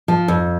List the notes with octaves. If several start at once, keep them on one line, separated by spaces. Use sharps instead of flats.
F3
F2